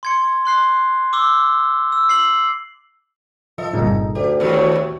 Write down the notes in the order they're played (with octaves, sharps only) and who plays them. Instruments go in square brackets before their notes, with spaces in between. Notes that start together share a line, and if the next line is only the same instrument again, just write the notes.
[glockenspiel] C6 G#6 C#7
C6 F#6 C7
D6 E6 G7
E6
C7 F#7
[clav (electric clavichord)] F3 D#5 E5 [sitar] A4
[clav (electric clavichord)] G1 C2 A#2 [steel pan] D#4 G#4
[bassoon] D2 [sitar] G4
[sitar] D#2 A3 C#5 [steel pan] F#4 G4 [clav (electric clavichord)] B4